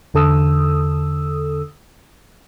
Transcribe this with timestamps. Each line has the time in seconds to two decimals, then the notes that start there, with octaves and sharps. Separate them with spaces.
0.14 E2 D3 A4 D#6 E6